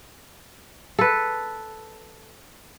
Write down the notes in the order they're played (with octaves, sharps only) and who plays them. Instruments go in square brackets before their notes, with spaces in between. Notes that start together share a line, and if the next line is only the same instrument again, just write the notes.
[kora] A4 B4